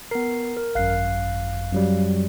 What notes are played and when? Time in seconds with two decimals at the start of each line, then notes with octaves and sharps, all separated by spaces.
0.11 B3 A#4 C7
0.57 A#4
0.75 G#1 F#2 F5 F#6 C7
1.72 F#2 F#3 G3